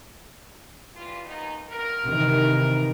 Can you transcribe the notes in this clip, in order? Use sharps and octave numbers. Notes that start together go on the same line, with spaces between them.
E3 G3 F4
D#2 B3 D#4
G2 B3 A#4
C3 D#3 E3